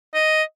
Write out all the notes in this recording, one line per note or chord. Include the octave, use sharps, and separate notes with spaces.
D#5